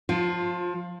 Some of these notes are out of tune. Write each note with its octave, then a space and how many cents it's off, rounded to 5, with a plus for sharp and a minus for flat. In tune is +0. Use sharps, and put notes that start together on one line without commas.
F3 +25 F4 +0